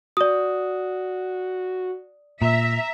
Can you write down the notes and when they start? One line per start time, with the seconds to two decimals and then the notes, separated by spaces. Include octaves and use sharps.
0.17 F#4 D5 D#6
2.42 A#2 E5 A#5